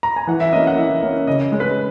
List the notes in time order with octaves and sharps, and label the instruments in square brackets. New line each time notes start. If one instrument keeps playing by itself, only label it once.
[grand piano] A#5
G#5
E3 F#5
E5
A#3 C#4 D#5
F#5
E3 E5
A#3 C#4
C#3 D#5
G#3 C#4
B4